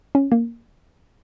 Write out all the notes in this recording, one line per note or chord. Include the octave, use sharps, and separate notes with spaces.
C#4
A#3